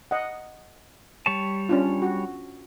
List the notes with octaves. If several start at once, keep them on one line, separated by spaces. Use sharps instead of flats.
D#5 F#5
G3 C#5 A5
C#4 D4 F4
F#4